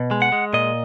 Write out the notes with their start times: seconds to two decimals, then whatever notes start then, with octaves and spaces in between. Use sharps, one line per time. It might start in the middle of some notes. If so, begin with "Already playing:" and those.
Already playing: B2
0.11 G#3
0.22 F#5
0.32 G#3
0.53 A#2 D#5